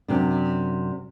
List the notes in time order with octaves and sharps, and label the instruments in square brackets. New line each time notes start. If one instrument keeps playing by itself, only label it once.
[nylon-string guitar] F#2 C3 D4